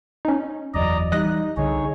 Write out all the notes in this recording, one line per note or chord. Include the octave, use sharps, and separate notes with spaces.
C#4 D#4
F#1 E2 F#3 D5 D#5 A#5
E3 G3 D#4 D#5 F#6 A#6
C2 D3 D#4 G#4 C#5